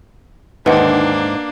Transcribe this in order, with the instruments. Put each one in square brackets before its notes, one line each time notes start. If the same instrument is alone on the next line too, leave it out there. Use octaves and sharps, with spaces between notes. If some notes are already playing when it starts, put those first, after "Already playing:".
[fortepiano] D#2 D3 [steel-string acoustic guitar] G#2 [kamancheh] A#3 D4 [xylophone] B4 F#5